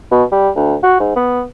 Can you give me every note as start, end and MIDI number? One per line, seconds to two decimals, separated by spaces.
0.11 0.24 47
0.32 0.49 55
0.56 0.75 38
0.83 0.96 66
1.00 1.13 44
1.16 1.42 59